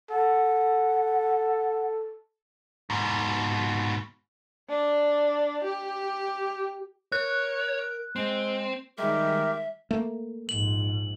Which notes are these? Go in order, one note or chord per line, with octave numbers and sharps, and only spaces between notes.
A4 F#5
G#2 B2
D4
G4
A#4 C#5 F#6
G#3 C4
D#3 G3 G#3 G4 A#4 E5
A3 A#3
A#1 G#2 F#7